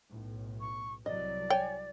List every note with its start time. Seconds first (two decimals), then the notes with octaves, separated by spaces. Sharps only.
0.11 B1 A2
0.60 C#6
1.06 C2 F#3 D5 D#5
1.50 C#5 G5 G#5